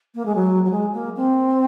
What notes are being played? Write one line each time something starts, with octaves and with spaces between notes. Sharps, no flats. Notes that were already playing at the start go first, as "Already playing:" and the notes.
A#3
G#3
F#3
F#3
G#3
A#3
C4